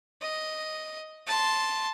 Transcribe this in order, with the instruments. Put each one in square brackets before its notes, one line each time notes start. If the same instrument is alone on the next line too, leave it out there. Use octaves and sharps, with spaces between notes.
[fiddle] D#5
A5 C6